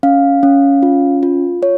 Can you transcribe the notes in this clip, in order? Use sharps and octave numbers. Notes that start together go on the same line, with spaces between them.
C#4 F5
C#4
F4
F4
F4 C#5